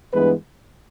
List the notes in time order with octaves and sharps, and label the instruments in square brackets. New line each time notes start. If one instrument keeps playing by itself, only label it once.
[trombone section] G2 E3 G#3 B3 B4